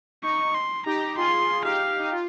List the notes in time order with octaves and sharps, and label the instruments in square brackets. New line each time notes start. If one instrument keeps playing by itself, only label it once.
[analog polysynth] D#4 [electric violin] C#6
[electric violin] C6
[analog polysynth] D#4 G4 [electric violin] A#5
[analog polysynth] F4 G#4 [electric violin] C6
[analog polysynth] D#4 G4 [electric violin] F5
[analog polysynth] D#4
F4